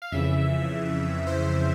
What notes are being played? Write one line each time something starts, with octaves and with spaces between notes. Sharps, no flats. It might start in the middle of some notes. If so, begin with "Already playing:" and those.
F5
F2 C#3 E3 E5
C5